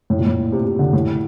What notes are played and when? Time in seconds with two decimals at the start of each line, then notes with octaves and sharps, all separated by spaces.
0.10 A2
0.19 A#2
0.26 A2
0.52 C3
0.66 C3
0.79 D3
0.93 A2